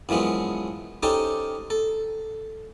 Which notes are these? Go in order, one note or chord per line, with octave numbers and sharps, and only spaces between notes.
F#2 E3 F3 G#3 B3
C#4 D#4 G4 A4 C5
A4